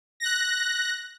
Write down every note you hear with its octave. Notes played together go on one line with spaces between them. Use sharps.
F#6 A#6